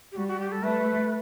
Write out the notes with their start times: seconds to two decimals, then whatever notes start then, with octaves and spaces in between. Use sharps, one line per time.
0.12 G4
0.16 G3 F#4
0.28 F#4
0.40 G4
0.52 A4
0.63 A3 B4